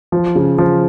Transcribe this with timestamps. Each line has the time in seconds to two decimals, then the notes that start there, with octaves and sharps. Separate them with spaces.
0.12 F3
0.35 C#3
0.58 F3